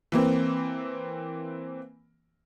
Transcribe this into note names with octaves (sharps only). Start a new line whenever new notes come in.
E3 A#3 C4